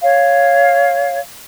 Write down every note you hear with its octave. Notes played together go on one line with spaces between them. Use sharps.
C#5 F5